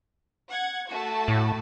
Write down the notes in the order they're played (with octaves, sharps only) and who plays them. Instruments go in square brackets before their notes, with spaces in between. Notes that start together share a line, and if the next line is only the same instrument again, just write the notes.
[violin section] F#5 G#6
A3 F#4 A5
[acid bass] A2